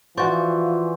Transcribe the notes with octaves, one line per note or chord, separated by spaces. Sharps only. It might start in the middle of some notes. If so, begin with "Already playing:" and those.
E3 F3 F4 F#4 D5 C6 C#6 G6